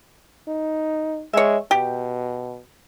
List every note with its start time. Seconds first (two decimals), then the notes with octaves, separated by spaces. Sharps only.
0.48 D#4
1.33 G#3 C#5 E5
1.71 B2 G4